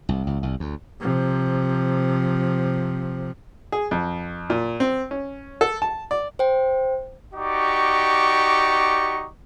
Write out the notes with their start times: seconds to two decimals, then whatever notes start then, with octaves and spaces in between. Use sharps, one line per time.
0.09 C2
0.27 C#2
0.43 C2
0.60 D2
1.01 C3 F3
3.72 G#4
3.91 F2
4.50 A#2
4.80 C4
5.11 C#4
5.61 A4
5.82 A5
6.11 D5
6.39 C5 G5
7.34 D#4 F#4 G4 D5 C#6